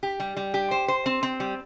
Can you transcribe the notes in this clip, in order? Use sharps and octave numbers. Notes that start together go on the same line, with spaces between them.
G4
G3
G3
G4
C5
C5
C4
C4
G3